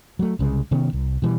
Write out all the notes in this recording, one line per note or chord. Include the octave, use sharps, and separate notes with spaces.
F#3 A3
C2 C#3 G#3
C3 D#3 B3 C#4
C2
B2 E3 G3